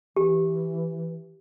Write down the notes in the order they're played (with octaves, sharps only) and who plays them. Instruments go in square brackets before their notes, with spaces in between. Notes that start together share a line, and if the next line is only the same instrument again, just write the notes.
[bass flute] E3 [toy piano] G4